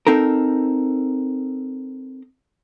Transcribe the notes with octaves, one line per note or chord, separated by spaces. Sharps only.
C4 D#4 A4 A#4